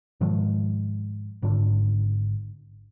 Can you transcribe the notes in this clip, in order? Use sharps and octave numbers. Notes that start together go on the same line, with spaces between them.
G#2 D#3 F3 G#3
G#1 G#2 D3 D4